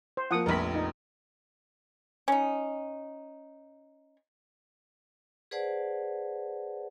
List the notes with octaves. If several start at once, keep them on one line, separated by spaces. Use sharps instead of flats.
C5
F3 A#3 F#5 D#6
F1 A#1 A#4 B5
D#4
C#4 D#4
G#4 B4 C5 D5 F#5 A5